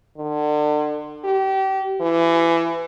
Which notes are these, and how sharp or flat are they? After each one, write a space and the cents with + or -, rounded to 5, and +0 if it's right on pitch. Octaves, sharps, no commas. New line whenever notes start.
D3 +35
G4 -30
E3 +25